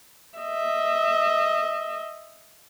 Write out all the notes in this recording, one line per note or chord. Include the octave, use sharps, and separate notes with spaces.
D#5 E5